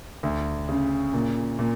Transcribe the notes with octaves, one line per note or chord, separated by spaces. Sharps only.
D2
C#3
A#2
A#2